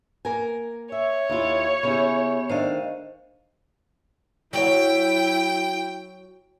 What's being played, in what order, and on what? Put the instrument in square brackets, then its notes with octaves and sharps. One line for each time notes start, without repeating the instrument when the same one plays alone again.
[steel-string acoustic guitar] A#3 A#4 G#5
[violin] C#5 [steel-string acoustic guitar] E5
[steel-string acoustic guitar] D#2 E4 F4
[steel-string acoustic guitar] C#3 C#4 E4 [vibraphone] B3 G4
[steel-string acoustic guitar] D#3 A3 D4 [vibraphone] C5 D#5 F5
[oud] F#3 F#4 C#5 [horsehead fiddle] E4 [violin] G5